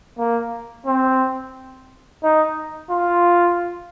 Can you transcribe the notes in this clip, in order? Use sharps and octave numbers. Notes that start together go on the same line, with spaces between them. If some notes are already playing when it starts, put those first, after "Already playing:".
A#3
C4
D#4
F4